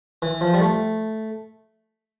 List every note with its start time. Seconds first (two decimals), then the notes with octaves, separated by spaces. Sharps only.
0.22 E3
0.41 F3
0.54 G3
0.61 A3